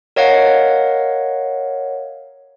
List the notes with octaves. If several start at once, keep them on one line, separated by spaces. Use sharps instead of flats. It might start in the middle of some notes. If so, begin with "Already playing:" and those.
A#4 C#5 D#5 F5 F#5